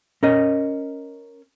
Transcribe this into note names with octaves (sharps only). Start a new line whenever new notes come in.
C#4 A#4 D#5